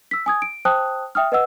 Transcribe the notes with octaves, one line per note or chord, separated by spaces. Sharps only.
E6 B6
G#5 D#6 G#6
D7
C5 G5 A5 D#6 F#6
E5 G5 D#6 F6
B4 D#5 F#5 E6